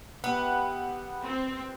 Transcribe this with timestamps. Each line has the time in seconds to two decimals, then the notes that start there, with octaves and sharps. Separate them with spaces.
0.24 B3 G4 B4 E5
1.23 C4